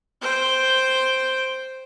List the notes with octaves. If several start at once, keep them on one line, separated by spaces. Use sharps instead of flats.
C5 G5